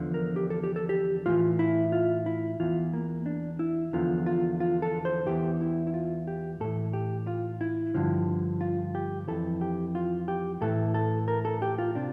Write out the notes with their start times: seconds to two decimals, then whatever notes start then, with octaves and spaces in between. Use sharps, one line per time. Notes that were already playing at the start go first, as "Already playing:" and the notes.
Already playing: E2 D3 F3
0.14 A#4
0.36 G4
0.50 A4
0.64 G4
0.76 A4
0.89 G4
1.26 A2 E3 F4
1.59 E4
1.92 F4
2.26 E4
2.60 E2 E3 F4
2.93 A#3
3.26 D4
3.59 E4
3.93 E2 D3 F3 F4
4.26 F4
4.60 F4
4.82 A4
5.05 C5
5.27 E2 E3 G4
5.61 E4
5.87 E4
5.94 F4
6.27 G4
6.60 A2 E3 A4
6.93 G4
7.27 F4
7.61 E4
7.94 G2 D3 F3
8.61 F4
8.95 G4
9.28 F2 E3 A4
9.61 G4
9.95 F4
10.28 G4
10.61 A2 E3 A4
10.94 A4
11.28 A#4
11.45 A4
11.62 G4
11.78 F4
11.95 C3 D4